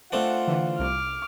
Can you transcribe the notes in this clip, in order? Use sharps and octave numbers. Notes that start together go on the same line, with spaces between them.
A3 C4 D4 F4 F#5
D3 E3
C2 D6 F6